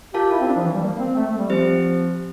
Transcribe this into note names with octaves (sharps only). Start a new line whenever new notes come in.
F4 G4 A#4 F5 A5
E4
C4
D4
F3
E3
G3
A#3
C4
A3
A3
G3
F3 C4 G4 C5